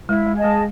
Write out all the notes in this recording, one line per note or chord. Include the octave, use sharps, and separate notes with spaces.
G#3 E4
G#3
G#4 D#5 A5
G#3